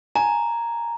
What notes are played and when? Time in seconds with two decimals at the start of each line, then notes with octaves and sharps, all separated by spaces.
0.15 G#5 A#5